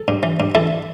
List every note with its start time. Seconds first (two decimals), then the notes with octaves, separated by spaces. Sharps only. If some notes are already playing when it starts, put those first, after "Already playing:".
Already playing: A4
0.08 G2
0.23 E3
0.40 G2
0.55 E3 E4 A4